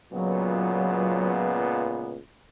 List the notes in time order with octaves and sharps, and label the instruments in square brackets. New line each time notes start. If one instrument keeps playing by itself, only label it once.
[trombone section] C#2 A#2 B3 [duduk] F#3